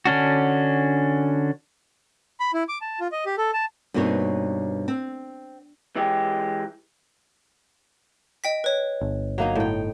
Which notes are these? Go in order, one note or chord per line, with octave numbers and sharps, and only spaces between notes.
D3 C#4 D4 F#4
B5
E4
D6
A5
F4
D#5
G4
A4
A5
G2 B2 A#3 C4 D#4 C#5
C4
E3 G#3 G4
D#5 G5 B6
B4 C#5
G1
F#3 A#3 D#4
A2 G5